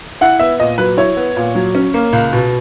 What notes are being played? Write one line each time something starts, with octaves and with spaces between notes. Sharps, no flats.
E4 F#5
B3 E5
A#2 D#5
F#3 B4
E4 C#5
B3
A#2
F#3
C#4
A#3
C#2
B2